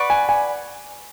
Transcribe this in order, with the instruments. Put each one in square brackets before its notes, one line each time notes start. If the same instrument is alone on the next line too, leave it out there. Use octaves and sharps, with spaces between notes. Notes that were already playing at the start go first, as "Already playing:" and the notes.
Already playing: [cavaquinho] B4 D5 F#5 C#6
[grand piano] G#5
G#5